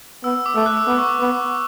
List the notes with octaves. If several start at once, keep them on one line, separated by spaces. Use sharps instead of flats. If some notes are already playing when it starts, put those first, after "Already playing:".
B3 E6
D6
A3 E6
F#6
E6
B3 D6
C#6
D6
B3 D6